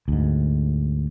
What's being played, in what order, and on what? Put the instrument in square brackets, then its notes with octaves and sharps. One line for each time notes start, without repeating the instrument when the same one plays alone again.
[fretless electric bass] D2 G#2